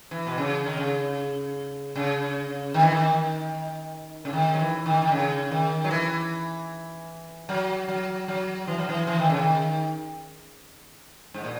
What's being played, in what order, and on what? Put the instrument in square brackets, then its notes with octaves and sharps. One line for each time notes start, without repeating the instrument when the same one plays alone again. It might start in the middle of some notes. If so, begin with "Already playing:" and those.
[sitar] E3
B2
C#3
D#3
C#3
C#3
D#3
E3
D#3
C#3
D#3
F#3
E3
D#3
D#3
C#3
D#3
F#3
E3
F#3
F#3
F#3
E3
F#3
E3
E3
D#3
C#3
D#3
G#2
A#2